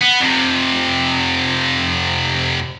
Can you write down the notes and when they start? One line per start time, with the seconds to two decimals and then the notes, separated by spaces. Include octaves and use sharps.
0.02 B3
0.21 F2 C3